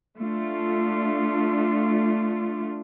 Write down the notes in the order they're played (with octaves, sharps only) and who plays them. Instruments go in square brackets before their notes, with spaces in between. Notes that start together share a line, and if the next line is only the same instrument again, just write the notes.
[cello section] A3 D4 F4